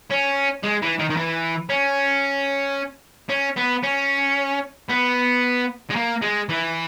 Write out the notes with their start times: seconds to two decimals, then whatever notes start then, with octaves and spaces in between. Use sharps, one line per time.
0.10 C#4
0.63 G#3
0.82 E3
0.99 D#3
1.10 D#3
1.17 E3
1.69 C#4
3.29 C#4
3.56 B3
3.83 C#4
4.89 B3
5.90 G#3
5.96 A#3
6.22 G#3
6.49 E3